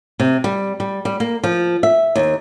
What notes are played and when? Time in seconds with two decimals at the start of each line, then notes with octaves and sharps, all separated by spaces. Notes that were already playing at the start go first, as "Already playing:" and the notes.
0.20 C3
0.44 G3
0.80 G3
1.05 G3
1.20 A#3
1.44 F3
1.83 E5
2.16 D#2